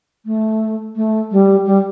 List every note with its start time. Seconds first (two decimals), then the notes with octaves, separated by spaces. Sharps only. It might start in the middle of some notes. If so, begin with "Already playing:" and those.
0.26 A3
0.96 A3
1.32 G3
1.66 G3